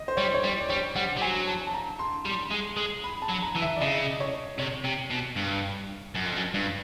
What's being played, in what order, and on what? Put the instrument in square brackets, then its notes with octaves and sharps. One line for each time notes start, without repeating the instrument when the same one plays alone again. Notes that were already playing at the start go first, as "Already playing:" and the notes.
Already playing: [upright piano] D#5
C5
[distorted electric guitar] G3 [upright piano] C#5
[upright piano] C#5
[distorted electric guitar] G3 [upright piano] C5
[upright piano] D5
[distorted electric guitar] G3 [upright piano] C#5
[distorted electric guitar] G3 [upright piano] F#5
[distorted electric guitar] G3
[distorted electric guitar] F#3 [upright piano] G#5
[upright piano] A5
A5
A#5
C6
[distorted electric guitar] G3 [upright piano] C6
[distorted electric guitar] G#3
G#3
[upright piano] B5
A5
[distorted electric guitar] F#3
[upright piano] A#5
[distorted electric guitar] E3
[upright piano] E5
D5
[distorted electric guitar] C#3 [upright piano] D#5
[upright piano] C#5
[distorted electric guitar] C3 [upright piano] C#5
[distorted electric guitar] C3
B2
G2
F#2
F2
F#2
G2